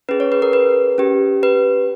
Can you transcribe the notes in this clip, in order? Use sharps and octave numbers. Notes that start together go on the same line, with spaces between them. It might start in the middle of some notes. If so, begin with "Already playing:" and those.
C#4 G#4 B4
C#5
B4
A#4
B4
C#4 G4
B4